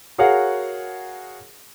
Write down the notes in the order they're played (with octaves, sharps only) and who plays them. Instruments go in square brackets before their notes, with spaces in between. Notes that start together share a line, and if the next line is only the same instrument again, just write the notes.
[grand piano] F#4 G#4 A#4 C#5 F5 F#5